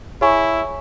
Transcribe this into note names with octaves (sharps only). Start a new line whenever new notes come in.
E4 G#4 C#5 G#5 C#6